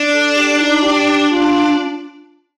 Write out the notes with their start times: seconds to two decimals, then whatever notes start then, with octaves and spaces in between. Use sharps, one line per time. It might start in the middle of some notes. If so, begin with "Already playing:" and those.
Already playing: D4
0.13 A4
0.36 G4
0.60 D#4
0.83 G4
1.30 F4